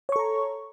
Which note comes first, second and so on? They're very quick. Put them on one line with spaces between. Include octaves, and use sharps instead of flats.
C#5 C#6 A4 A#5